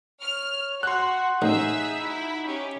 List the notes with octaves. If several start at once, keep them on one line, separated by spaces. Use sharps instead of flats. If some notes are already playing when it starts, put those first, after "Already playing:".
C#5 F6
F#4 F#5 C6 F#6
A1 D#4 G#4 E5 E6
E4 F#4
C#4 G4